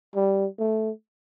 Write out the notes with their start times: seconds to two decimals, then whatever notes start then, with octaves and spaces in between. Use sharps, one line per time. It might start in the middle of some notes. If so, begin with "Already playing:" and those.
0.16 G3
0.59 A3